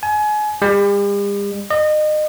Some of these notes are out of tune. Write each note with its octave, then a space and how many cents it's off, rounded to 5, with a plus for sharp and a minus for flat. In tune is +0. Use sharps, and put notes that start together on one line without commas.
G#5 +30
G3 +45
D#5 -30